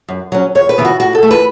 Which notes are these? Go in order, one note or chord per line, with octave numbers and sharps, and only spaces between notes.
F#2
F#3 C#4
E2 C#5
B4
C#3 E3 B3
F#4
A2 F#4
A4
A3
E3 B4